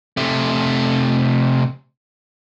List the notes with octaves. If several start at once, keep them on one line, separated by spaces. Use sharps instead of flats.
C3 A3